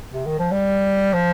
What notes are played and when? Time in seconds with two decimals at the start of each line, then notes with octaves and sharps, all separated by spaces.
0.13 C3
0.26 D#3
0.39 F3
0.51 G3
1.14 F3